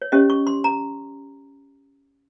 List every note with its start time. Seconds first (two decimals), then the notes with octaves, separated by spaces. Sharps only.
0.02 C#5
0.12 C#4 G4 C#5 D#5
0.30 C#6
0.47 C6
0.64 A#5